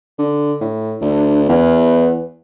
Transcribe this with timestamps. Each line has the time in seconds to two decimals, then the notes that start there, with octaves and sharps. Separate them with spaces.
0.19 D3
0.61 A2
1.01 D2 D4
1.49 E2 B4